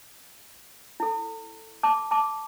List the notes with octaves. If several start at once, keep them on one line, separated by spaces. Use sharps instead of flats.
E4 A4
A5 D6
A5 D6